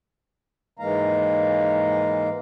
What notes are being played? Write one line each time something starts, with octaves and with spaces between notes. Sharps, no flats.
G#2 E3 G#3 A#3 F5 A#5